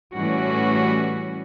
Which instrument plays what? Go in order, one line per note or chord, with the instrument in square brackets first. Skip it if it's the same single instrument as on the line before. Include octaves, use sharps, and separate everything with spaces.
[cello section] A2 E3 G3 C#4 F#4